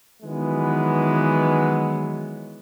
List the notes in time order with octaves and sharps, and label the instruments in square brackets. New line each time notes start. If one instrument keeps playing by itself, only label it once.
[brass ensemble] D#3 E3 F#3 G#3 B3